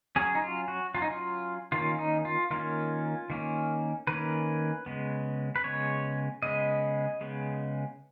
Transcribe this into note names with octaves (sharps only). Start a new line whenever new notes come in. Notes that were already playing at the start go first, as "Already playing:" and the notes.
F#3 C#4 G#4
D#4
F4
F#4
F#3 C#4 F4
D#4
F4
D#3 A#3 C#4 F4
D#4
F4
D#3 A#3 C#4 F4
D#3 A#3 C#4
D#3 A#3 C#4 B4
C#3 G#3 B3
B4
C#3 G#3 B3 C#5
C#3 G#3 B3 D#5
C#3 G#3 B3